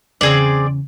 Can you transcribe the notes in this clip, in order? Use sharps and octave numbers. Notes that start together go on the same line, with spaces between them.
E2 C#3 C4 G#4 D5